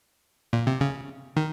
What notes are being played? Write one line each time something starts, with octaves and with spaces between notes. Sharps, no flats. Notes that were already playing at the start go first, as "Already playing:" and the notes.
A#2
C3
C#3
D#3